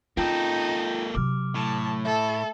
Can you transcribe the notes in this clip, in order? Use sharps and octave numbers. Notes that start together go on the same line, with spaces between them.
A#3 C#4 D#4 F4 A4 G5 G6
C3 F#3 D6 F6
A2 A5
A3 A4 E5